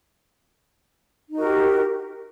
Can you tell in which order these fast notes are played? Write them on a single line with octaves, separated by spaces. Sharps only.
D#4 F#4 A#4 G4